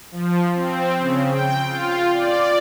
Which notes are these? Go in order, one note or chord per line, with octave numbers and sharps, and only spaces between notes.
F3
C4
C#3
G5
F4
D5